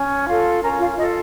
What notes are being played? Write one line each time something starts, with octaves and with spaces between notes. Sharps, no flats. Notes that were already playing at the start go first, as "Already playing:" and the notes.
Already playing: C#4
F4 A4
C#4 A#4 A#5
F4 F5
D#4 F4 A4 D#5